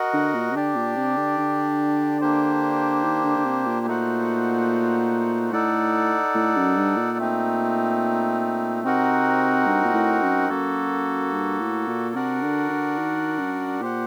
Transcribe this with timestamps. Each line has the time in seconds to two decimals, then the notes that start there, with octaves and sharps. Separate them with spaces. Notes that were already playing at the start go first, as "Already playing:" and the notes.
Already playing: F#4 A#4 D#5 F#5
0.14 D3
0.34 A#2
0.50 C3
0.55 D3 D4 G4 D5
0.76 A#2
0.96 C3
1.17 D3
1.38 D3
2.21 A#3 D4 G4 C5
3.04 D#3
3.24 D3
3.37 D3
3.45 C3
3.66 A#2
3.86 A3 D#4 F#4 C5 F#5
5.52 A2 D#4 A4 D5 F#5
6.35 A2
6.56 F#2
6.77 G2
6.97 A#2
7.18 A3 C4 D#4
8.84 C3 C4 D#4 F#4 A#4 F#5
9.67 G2
9.84 A#2
9.94 A2
10.22 F#2
10.49 F#2 A#3 F#4 A4
11.33 G2
11.60 A2
11.88 A#2
12.15 C3 D4 F#4 A#4 D5 F#5
12.43 D3
12.70 D3
12.98 D#3
13.39 F#2
13.81 A#2 G4 C5 F#5